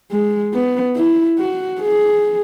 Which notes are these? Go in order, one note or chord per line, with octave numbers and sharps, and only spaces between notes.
G#3
B3
E4
F#4
G#4